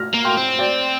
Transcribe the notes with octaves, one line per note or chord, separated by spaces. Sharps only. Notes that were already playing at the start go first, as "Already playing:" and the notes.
Already playing: F6 A#6
A#3
G5 C6
C4
D5 G5